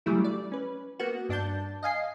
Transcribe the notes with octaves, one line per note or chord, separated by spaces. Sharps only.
C#3 F#3 G3 A3 E4
D5
C#4 B4
A#3 B3 F#4
G2 D4 D5 A5 G6
D#5 F5 G#5 C7